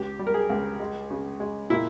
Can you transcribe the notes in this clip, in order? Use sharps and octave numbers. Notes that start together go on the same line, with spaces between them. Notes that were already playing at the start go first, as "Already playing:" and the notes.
Already playing: C#2 G4
G3
A#4
G#4
C#2
G#3
C#3
G#3
A#2 E4